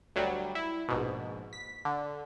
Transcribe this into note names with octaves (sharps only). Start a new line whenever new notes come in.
D2 F#3 G3
E4
A#1 G#2 B2
B6
D3